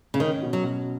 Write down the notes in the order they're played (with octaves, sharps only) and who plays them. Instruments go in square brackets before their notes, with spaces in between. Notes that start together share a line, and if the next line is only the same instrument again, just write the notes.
[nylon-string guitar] C#3
[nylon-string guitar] D#3 [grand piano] C#4
[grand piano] B2
[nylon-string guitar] F#3
[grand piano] B2